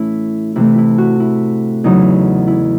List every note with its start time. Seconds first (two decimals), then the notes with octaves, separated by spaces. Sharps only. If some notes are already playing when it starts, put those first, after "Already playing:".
Already playing: A2 E3 A3 C#4 E4
0.56 C3 E3 A3 E4
0.78 E4
0.98 F#4
1.20 E4
1.84 E2 C#3 F#3 D#4
2.47 E4